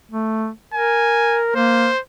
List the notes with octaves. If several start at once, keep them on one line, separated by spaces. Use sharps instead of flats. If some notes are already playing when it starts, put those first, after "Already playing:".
A3
A#4 G#5
A#3 C5